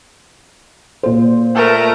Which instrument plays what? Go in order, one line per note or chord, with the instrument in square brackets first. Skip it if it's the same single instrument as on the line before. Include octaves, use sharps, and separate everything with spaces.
[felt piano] A#2 C5
[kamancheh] A3 A#4